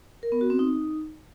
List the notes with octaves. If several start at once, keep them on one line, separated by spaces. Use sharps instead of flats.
A#4
B3
F#4
C4
D#4